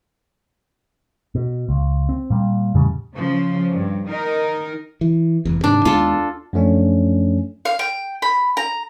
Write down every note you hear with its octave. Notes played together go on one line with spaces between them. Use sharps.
B2
C#2
C4
A#2 G3
E2 A2 C#3 G3
C#3 F3
G2
D#3 D#4 A#4
E3
F1 E2
G#2 C3 D#3 D4
D#2 G#3 B3 F4 A4
F#2 F3 A3 C#4 D4
F5
G5
B5
A#5